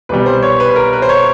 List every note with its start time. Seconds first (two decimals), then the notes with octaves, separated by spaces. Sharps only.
0.09 C2 B2 G3 B4
0.26 C5
0.42 C#5
0.60 B4
0.71 B4
0.76 A#4
0.93 B4
1.02 C5
1.09 C#5